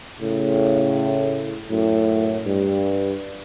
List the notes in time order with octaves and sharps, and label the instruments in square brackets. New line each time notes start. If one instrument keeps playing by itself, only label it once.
[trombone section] A2 C#3
F#2 A2
G2